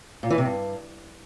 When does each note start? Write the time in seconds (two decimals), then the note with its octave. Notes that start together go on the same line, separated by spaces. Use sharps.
0.23 A#2
0.30 E3
0.38 C3
0.45 G2